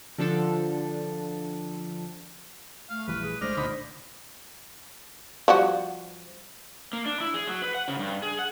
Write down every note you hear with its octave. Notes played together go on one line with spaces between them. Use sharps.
D3 F3 D4 A4
A3 F5
A#1 E3 G3 B4
G#4
C2 G#3 A3 D4 C5 D#5 F6
C#2 A#2 D3 D#4 B5
F3 G3 F#4
A#3
D4
E4
G#4
F#3
B4
F#5
C#3
G2
G#4
F#5